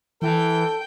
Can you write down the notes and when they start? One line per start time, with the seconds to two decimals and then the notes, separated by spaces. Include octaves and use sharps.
0.22 E3 A4 G5